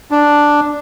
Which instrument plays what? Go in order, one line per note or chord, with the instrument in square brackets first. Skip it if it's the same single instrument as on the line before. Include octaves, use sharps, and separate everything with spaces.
[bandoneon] D4